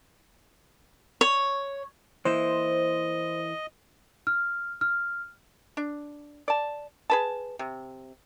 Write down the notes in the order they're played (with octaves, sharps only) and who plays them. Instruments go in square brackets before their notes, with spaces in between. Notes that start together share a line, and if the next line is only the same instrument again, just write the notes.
[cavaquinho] C#5
[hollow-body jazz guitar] E3 A#3 E4 [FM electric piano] C5 [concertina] D#5
[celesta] F6
F6
[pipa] D4
D5 A5
G#4 B4 A5
C3